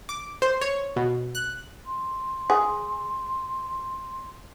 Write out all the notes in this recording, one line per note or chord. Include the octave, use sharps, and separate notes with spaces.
D6
C5
C#5
B2
F#6
C6
G#4